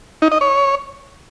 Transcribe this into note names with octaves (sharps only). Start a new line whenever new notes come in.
D#4
D#5
C#5